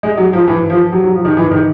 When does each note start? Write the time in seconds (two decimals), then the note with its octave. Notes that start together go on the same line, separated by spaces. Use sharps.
0.03 G#3
0.17 F#3
0.33 F3
0.48 E3
0.70 F3
0.92 F#3
1.04 F#3
1.14 F3
1.25 D#3
1.37 E3
1.51 D#3